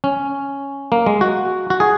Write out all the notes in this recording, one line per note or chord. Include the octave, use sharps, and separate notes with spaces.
C#4
A#3
G#3
F#4
F#4
G#4